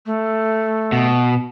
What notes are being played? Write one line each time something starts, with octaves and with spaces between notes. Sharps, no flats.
A3
B2